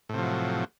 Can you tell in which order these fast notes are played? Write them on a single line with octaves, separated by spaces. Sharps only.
A2 C3 F3 F#3